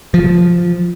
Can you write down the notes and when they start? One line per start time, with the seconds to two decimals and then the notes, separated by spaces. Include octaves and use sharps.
0.14 F3